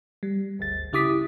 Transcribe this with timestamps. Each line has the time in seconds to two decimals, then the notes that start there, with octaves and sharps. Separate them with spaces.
0.23 G3
0.59 G1 D2 A6
0.93 C#3 E4 G4 D6 D#6 B6